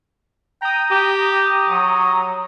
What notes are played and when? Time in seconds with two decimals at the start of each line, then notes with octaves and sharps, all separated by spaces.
0.62 G5 A#5 D#6
0.91 G4
1.69 F#3